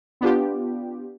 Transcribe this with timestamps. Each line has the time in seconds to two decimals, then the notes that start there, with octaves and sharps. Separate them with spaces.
0.21 B3 D4 F4 G4